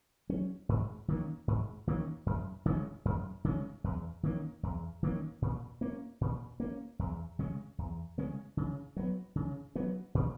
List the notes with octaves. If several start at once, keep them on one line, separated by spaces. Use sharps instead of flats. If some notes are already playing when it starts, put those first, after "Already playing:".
F#3 C#4
G#2
D#3 A#3 C#4
G#2
D#3 A#3 C#4
F#2
C#3 G#3 C#4
F#2
C#3 G#3 C#4
E2
D#3 A#3 C#4
E2
D#3 A#3 C#4
A#2
A#3 C#4
A#2
A#3 C#4
E2
C#3 G#3 C#4
E2
C#3 G#3 C#4
C#3
F#3 B3
C#3
F#3 B3
A#2